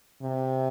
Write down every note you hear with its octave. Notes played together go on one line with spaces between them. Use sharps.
C3